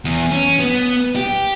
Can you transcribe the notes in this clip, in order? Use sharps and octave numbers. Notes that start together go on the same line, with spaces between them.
E2
C#4
B3
G4